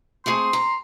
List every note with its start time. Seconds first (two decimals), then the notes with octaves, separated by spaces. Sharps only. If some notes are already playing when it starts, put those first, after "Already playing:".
0.26 A3 C4 G#4 C6
0.53 A#5